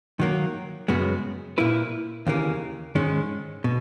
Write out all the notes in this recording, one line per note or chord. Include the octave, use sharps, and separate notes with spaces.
D#3 F#3 A#3
F#2 C#3 G#3 B3 F#4
A#2 A#3 E4 B4
D#2 C#3 E3 A#3 C#4
G#2 D#3 G#3 C#4
B2